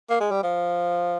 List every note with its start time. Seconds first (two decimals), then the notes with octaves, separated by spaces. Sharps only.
0.10 A#3
0.20 G#3
0.31 G3
0.43 F3